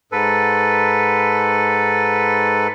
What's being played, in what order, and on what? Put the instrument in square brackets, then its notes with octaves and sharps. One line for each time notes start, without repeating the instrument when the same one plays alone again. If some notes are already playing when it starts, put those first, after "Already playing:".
[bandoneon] G#2 A4 B4